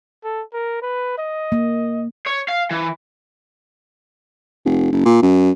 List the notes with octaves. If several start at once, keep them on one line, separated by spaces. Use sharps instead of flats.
A4
A#4
B4
D#5
A#3
C#5
F5
E3
F1
F#1
A#2
F#2